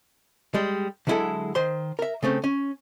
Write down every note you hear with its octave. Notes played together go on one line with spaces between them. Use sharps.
G3 G#3
D3 F#3 G#3 E4 G#4 A4
D#3 C5 C6
A#4 E5
C#3 A3 C4 C#4
C#4